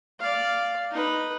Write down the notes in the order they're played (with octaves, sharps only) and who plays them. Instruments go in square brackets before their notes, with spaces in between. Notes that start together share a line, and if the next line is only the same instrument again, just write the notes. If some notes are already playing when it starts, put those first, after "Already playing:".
[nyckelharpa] D5 F5
D#4 B4